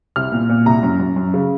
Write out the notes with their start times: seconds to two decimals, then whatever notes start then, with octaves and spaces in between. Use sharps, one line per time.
0.16 C2 F6
0.32 A#2
0.49 A#2
0.66 C2 A#5
0.83 F#2
1.00 F#2
1.16 F#2
1.34 C#3